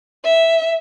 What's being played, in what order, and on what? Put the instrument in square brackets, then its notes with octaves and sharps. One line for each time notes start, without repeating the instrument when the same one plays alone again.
[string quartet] E5